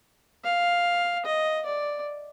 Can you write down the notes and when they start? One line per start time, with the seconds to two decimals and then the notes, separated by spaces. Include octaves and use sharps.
0.45 F5
1.26 D#5
1.66 D5